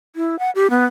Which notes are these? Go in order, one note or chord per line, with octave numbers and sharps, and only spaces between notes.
E4
F#5
G4
B3